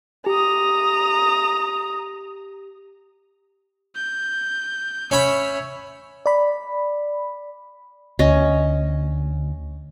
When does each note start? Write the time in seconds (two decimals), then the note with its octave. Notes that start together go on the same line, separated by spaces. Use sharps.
0.26 G4 A#5 D#6
3.96 G6
5.11 C#4 C#5 E5 B5
6.26 D5 B5
8.19 D2 C#4 D#5